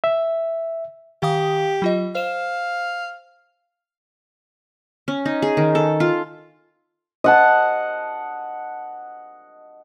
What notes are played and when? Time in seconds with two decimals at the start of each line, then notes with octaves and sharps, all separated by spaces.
0.04 E5
1.23 D#3 G4 F5 D#6
1.82 F#3 F4 D#5
2.15 C5 F5 E7
5.08 C#4
5.26 D#4
5.42 G#4
5.57 D#3
5.75 A4
6.00 F4
7.24 D#5 F#5 A5